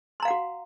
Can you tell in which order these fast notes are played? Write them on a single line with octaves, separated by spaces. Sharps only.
C6 A#5 F5 F#5 F#4